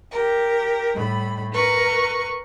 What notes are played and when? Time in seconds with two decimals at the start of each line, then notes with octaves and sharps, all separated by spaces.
0.12 G4 A#4
0.95 A2 G3 B5
1.52 A#4 B4 C#6